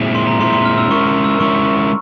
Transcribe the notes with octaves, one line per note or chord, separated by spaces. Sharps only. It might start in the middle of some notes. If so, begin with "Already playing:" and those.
Already playing: A#2 G#3 C4 E4
C6
A#5
A#2 G#3 C4 E4 C6
C6
F6
E6
G#3 C#4 E4 A#4 C#6
C#6
E6
G#3 C#4 E4 A#4 C#6